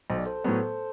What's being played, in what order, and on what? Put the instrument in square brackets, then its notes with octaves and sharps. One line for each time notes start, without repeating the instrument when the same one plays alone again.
[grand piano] B1 [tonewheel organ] C5
[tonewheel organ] D5
A4 C5
[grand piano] A2 F#3 B3